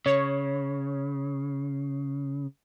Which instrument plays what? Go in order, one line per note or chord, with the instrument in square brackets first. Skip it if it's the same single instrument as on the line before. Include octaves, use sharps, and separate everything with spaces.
[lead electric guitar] C#3 [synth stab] C#5